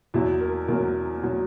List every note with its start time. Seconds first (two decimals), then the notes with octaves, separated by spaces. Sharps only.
0.14 E2 B2 F#3 E4
0.40 A#4
0.68 E2 B2 F#3 A#4
1.23 B2 F#3